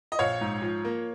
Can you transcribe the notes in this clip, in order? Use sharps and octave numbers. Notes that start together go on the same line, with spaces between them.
D#5
A#1 C#5 F5
G#2
F3
A#3